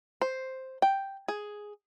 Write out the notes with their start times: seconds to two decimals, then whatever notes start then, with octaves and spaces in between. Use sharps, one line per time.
0.22 C5
0.82 G5
1.28 G#4